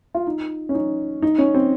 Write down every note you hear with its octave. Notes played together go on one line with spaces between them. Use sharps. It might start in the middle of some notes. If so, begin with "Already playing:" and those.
F4
D#4
C#4
D#4
D#4
C#4
C4